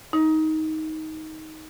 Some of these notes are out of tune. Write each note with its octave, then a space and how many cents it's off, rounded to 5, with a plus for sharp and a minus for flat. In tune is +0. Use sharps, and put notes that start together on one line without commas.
D#4 +15